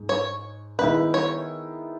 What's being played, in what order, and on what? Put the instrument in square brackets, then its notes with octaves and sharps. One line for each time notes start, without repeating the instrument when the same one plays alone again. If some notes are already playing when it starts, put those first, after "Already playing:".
Already playing: [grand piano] G#2
[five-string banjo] C#5
[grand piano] D#3 G#3 B3 E4 [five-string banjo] B4
[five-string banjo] C#5